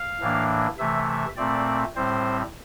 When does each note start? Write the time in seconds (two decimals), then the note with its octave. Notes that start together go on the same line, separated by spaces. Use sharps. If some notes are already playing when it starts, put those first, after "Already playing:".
Already playing: F5
0.21 A2 E3 A#3 D4
0.78 C3 E3 A3 E5
1.08 E5
1.37 A#2 A3 C4 D5
1.96 A2 G3 C4 C5